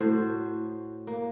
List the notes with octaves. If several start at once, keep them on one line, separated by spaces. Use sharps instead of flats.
A2 F#4 C5
A#3